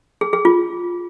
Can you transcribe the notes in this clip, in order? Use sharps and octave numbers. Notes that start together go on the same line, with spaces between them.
G#4
G#4
F4